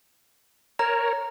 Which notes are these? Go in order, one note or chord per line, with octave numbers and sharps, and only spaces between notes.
A#4 C#5 A#5